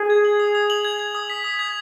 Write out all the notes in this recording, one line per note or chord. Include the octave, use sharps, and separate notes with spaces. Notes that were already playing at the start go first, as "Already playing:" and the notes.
Already playing: G#4
G#6
F#7
D#6
D#6
F#7
G#6
G#6
D#6
B6
D#6
G#6